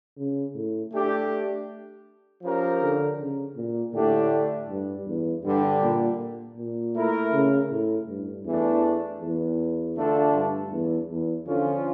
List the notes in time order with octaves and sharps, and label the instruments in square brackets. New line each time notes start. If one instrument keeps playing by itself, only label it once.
[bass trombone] C#3
A2
[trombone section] A3 D4 G4
F3 C#4 G4 A#4
[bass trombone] D3
C#3
A#2
[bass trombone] A2 [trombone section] D3 A3 D4 G4
[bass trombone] G2
E2
[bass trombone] G2 [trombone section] D3 G3 D4 G4
[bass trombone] A#2
A#2
[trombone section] A3 E4 A#4
[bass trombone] C#3
A2
G2
[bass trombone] E2 [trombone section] E3 A3 D4
[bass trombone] E2
[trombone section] D3 A3 D4 F4 A4
[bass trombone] G2
E2
E2
[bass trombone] D3 [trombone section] F3 C#4 F4